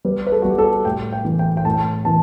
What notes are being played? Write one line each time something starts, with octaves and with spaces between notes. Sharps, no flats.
G3 B4
B4
A4
G3 F#4
G4
A4
A2 G5
G5
E3
G5
G5
A2 A5
E3 A5